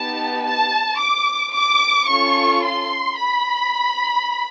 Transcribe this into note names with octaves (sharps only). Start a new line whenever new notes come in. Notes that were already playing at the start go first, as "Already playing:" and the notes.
Already playing: B3 D#4 G4 A5
A5
D6
D6
C#4 F4 A4 C#6
C6
B5